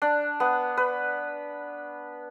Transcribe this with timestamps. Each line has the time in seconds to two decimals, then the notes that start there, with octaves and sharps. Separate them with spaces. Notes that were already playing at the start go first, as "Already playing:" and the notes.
0.02 D4
0.40 B3
0.77 B4